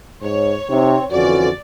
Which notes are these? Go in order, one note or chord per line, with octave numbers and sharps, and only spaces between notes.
G#2 C#5
C3 C4 D#4
F2 D3 E3 C#4 F#4 D5